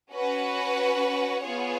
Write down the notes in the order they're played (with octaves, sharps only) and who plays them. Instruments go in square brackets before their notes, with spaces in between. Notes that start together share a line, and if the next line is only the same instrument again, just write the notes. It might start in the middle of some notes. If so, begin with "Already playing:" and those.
[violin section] C#4 F#4 B4 F#5
B3 F4 G#4 C#5